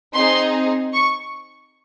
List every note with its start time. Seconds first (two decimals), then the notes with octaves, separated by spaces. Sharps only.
0.15 C4 D#4 G#4 C6
0.93 C#6